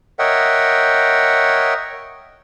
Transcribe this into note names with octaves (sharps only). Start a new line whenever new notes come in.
A#4 C#5 D#5 E5 F#5 G5